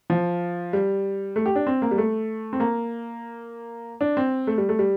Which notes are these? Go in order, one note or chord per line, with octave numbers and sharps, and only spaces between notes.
F3
G3
A3
G4
D4
C4
A#3
G3
A3
C4
A#3
D4
C4
A3
G3
A3
G3